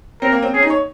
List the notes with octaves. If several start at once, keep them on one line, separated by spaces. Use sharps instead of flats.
C4 A#4
A#3
C4
C#4 G#4
D#4
C#5